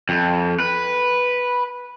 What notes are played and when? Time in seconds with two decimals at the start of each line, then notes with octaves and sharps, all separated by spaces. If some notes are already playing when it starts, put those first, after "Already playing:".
0.09 F2
0.60 B4